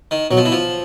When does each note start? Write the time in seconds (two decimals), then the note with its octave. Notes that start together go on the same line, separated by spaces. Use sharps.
0.11 D#3
0.30 B2 F#3
0.37 F3
0.46 E3
0.52 F3